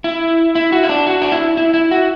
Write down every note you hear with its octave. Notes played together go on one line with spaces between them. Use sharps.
E4
E4
F#4
E4
D4
F#4
D4
E4
E4
E4
F#4